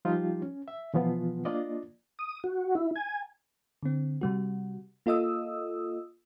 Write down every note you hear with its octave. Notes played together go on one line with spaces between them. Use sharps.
F3 G3 D#4 F4 G4
C#4
E5
B2 E3 F3 B3 F4
A#3 D4 F4 D5 D#5
D#6
F#4
E4
G#5
D3 C4
C3 G3 F#4
A#3 F4 A4 D#5 D#6 E6